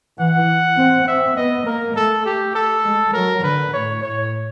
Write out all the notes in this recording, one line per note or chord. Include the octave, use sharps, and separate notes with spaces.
E3 F#5
C4
C4 E5
B3 D#5
A#3 A#4
A3 A4
G4
A4
G#3
F#3 A#4
D3 B4
A2 C#5
A2 C#5